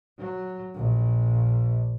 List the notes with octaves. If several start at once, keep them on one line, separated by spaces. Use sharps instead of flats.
F#3
A#1